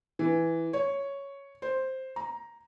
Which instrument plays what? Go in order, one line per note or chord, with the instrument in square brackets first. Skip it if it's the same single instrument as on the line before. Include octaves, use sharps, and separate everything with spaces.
[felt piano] E3
C#5
C5
A#5